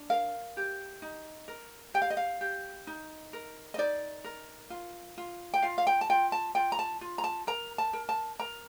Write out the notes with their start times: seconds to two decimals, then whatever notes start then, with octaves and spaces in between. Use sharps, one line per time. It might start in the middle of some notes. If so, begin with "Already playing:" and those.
Already playing: D4
0.10 A#4 F5
0.57 G4
1.02 D#4
1.48 A#4
1.94 G4 G5
2.02 F5
2.10 D#5
2.17 F5
2.41 G4
2.87 D#4
3.33 A#4
3.74 D#5
3.78 D#4 D5
4.24 A#4
4.70 F4
5.18 F4
5.54 G5
5.62 F4 F5
5.78 F5
5.87 G5
6.01 A5
6.09 F4 G5
6.32 A5
6.55 F4 G5
6.72 A#5
6.79 A5
7.01 F4
7.18 A#5
7.24 A5
7.47 A#4 A#5
7.78 A5
7.93 A#4
8.09 A5
8.39 A#4 A#5